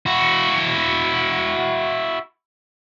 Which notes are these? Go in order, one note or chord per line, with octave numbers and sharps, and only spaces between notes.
E4 F#4